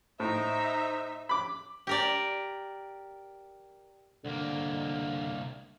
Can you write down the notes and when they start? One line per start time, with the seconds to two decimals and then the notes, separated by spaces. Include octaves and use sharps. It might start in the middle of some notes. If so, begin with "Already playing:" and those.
0.20 A2 D#4 C5 E5
1.29 B5 D6
1.87 G4 A#4 D5
4.25 C2 D3 A#3